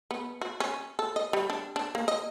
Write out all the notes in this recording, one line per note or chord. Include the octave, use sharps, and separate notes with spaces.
B3
F#4
C#4
A4
D#5
G3
D4
D4
A#3
D#5